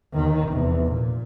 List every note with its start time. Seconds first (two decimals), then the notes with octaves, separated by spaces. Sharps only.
0.14 D#2 D#3
0.50 F1 E2
0.91 A#2